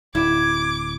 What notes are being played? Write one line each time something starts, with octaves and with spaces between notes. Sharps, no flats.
D1 E4 D6 G#6